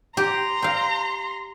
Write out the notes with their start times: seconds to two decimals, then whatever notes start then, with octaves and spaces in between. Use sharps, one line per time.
0.17 G4 A#5 C6
0.62 F5 G5